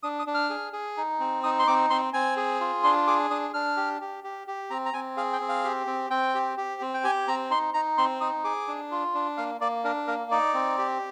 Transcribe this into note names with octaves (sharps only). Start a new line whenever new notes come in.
D4 D#6
D#6
D4
F6
G#4
G#4
D#4
C4
D#4 D#6
C6
C4 D6
C4 C6
C4 G#5
G#4
F4
D4 C6
G#4 D6
D4 D#6
D4 F6
G4
G4
G4
G4
C4 A#5
A#5
C4 G#5
G#4 F5
G5
C4
F5
G4
C4
C4 G5
G4
G4
C4
G5
G4 G#5
C4 A#5
D#4 C6
D#4 A#5
C4 C6
D#4 D#6
G#4 D6
D4
F4
D4
A#3 F5
A#3 D5
D4 A#4
A#3 A#4
D#4 D5
C4
G4